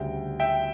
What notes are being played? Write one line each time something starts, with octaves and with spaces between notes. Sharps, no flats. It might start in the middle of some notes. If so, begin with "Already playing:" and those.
Already playing: D2 C#3 G3 G5
E5 G5